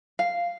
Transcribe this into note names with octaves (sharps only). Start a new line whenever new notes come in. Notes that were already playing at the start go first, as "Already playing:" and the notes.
F5